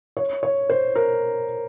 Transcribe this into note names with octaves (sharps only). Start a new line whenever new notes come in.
C#5
C#5
C5
A#4